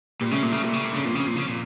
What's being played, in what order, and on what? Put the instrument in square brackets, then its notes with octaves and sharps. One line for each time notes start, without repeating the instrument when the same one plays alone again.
[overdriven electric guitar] A#2 [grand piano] G3
[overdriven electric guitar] C#3 [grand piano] A3
[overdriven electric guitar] A#2 [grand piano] A#3
[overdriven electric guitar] C#3 [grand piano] A3
[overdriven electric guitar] A#2 [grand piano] G3
[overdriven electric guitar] C#3
A#2
[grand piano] G2 [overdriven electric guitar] C#3
[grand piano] F2 [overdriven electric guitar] A#2
[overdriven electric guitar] C#3
A#2
C#3
A#2